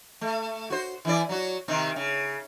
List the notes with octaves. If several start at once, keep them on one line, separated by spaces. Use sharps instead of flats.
A3
F#4 C5
E3 E4 D5
F#3 F#4
C3 D#3 C4
C#3